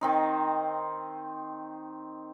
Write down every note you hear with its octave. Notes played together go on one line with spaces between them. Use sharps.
D#3 C4 D#4